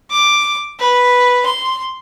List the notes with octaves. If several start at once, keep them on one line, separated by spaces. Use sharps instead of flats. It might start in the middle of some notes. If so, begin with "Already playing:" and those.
D6
B4
C6